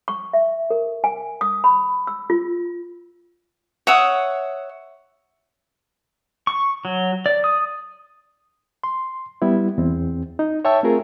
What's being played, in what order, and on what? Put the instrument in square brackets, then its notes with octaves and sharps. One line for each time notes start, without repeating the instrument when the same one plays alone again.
[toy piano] C#6
E5
A#4
G#5
D#6
B5
E6
F4
[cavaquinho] C#5 E5 F#5 D#6
[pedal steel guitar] C#6
F#3
D5
D#6
[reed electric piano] C6
G3 B3 E4
E2 C4
D#4
C#5 E5 G5 A5 C#6 E6
A3 C4 F4 G#4 A#4